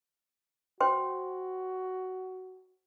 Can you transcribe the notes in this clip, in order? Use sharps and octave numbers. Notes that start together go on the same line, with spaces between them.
F#4 C5 G5 C6